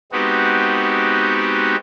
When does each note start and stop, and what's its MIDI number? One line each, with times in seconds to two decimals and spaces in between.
0.12 1.76 56
0.12 1.76 59
0.12 1.76 60
0.12 1.76 63
0.12 1.76 66
0.12 1.76 67